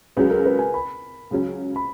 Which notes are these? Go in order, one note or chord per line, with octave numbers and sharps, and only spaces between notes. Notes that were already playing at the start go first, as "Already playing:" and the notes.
C#2 C#3 F#3 B4
A#4
B4
G#5
B5
C#2 C#3 F#3 C#4
B5